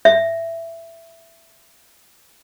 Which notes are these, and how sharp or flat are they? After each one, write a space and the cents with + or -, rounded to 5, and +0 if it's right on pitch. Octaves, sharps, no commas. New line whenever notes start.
E5 +10